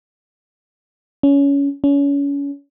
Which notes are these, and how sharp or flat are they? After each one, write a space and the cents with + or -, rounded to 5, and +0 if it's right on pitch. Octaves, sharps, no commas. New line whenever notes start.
C#4 +20
C#4 +30